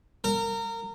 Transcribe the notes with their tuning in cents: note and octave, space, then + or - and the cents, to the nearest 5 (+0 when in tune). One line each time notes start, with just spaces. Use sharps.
A#4 -25